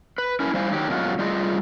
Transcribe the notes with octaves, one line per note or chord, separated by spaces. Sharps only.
B4
C#4 E4 A#4
G3 E4 C5 F5 G#5
D#3 F#3 G4
F#2 B2 G#3 F4 F#4
G3 A3 F4 G#4 D#5